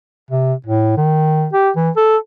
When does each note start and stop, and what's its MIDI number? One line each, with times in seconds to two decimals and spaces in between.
0.31 0.53 48
0.66 0.95 45
0.97 1.47 51
1.53 1.70 67
1.76 1.90 52
1.97 2.17 69